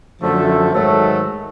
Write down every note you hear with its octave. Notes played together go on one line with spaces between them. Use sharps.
F#2 D3 F3 A3
G#2 D#3 F#3 A3